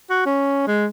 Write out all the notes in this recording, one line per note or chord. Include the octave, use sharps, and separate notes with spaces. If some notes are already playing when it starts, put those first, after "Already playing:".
F#4
C#4
G#3